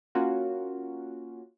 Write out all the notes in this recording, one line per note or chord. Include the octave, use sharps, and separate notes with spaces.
A#3 C#4 F4 F#4